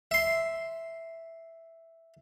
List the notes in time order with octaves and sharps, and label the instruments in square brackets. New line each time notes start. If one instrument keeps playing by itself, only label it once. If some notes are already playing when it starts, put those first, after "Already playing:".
[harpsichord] E5 C6